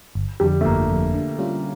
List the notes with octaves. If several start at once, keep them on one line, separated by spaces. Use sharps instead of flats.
G1
F2 D3 G3
A3
G1 A#3
F2 D3
D3
G3 C#4 F4